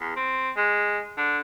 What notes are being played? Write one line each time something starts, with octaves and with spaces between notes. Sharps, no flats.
E2
C4
G#3
D3